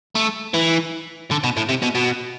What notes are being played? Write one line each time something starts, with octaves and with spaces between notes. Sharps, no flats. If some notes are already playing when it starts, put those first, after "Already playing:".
A3
E3
D3
B2
A2
C3
B2
B2